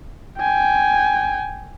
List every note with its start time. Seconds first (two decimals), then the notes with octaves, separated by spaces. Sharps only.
0.38 G5 G#5